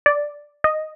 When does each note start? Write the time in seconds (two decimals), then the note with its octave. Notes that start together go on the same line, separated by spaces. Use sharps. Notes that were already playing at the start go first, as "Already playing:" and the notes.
0.06 D5
0.64 D#5